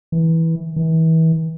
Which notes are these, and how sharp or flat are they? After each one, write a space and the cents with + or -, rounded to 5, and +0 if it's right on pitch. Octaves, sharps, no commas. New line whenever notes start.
E3 -15
E3 -35